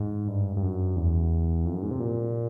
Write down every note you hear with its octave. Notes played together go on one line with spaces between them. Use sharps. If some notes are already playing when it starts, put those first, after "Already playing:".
Already playing: G#2
G2
G2
F#2
E2
F2
F#2
G#2
C3
A#2